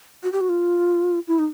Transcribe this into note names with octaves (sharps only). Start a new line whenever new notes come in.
F#4
G4
F#4
F4
E4
D#4